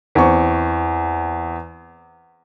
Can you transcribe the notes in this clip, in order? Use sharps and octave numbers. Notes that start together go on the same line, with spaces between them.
E2 C4 C#6